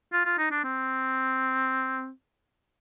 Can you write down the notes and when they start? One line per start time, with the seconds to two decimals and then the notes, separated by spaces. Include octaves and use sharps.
0.13 F4
0.25 F4
0.38 D#4
0.51 D4
0.64 C4